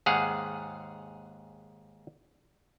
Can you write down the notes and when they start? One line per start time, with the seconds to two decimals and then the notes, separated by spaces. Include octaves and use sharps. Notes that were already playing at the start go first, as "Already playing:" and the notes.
0.06 D#2 G#2 G#4 F5 F#5